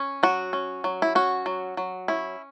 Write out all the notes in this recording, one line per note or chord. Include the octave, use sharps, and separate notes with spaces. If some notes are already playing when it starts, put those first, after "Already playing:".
Already playing: C#4
F#3 F#4
C#4
F#3
E4
C#4 F#4
F#3
F#3
C#4 E4